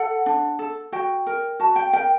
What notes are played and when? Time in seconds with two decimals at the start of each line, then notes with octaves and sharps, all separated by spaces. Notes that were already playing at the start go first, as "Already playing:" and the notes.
Already playing: A4 F#5
0.26 D4
0.59 A4
0.92 F#4 G5
1.27 A#4
1.60 F#4 A5
1.76 G5
1.93 A#4 G5